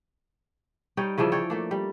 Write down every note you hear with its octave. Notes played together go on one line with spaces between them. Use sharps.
G3 D#4 C#5 G5
C#3 E3 F3 D4
C#5 D5 G5
A3 A#3 D4
G3